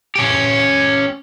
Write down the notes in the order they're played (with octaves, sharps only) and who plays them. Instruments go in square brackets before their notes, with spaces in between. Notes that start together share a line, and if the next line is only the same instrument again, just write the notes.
[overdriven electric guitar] C#4 G4